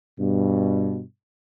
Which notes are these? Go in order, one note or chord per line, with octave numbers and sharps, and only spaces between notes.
G2 B2